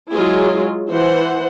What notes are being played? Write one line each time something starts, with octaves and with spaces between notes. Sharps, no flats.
F#3 G#3 E4 F4 G#4
E3 C5 F#5